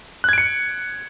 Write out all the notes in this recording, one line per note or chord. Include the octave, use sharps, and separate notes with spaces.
F#6 G#6 C#7 D7